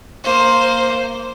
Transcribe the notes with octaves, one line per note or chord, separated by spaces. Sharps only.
A#3 C5